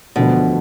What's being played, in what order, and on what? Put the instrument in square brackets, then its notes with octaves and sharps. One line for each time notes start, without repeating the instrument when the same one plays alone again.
[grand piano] E1 D2 D3 F3 B3 [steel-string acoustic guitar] B2